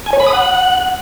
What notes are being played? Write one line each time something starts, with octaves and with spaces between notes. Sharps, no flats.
G#5
C#5
B5
D#6
F#5